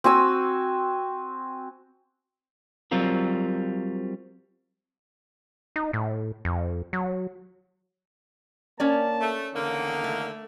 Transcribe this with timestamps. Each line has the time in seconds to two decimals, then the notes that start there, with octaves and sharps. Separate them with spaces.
0.04 C4 F#4 G#5 E6
2.91 F#3 G3 C4 F4 A#4
5.76 D#4
5.93 A2
6.45 F2
6.93 F#3
8.80 A#3 C#4 C#5 D5 A5
9.20 A3
9.54 E2 D3 D#3 A#3 D#4
10.04 A3